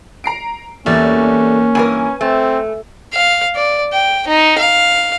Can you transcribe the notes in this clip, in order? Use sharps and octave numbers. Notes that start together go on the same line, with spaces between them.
A#5 C7 D7
E2 G3 A3 A#3 C#4
G2 E3 A#4 B4 G#5
A3 C4
F5
D5
G5
D#4
F5